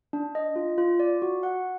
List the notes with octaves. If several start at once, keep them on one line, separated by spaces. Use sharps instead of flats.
D4
D#5
F4
F4
D5
F#4
F#5